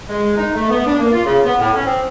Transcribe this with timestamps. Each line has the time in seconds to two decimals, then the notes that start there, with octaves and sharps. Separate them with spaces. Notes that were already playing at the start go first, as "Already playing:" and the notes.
0.08 G#3
0.37 D#4
0.54 A3
0.70 B3
0.86 D4
0.99 A#3
1.13 F4
1.25 C#3
1.44 B3
1.59 A2
1.74 C#4
1.86 C4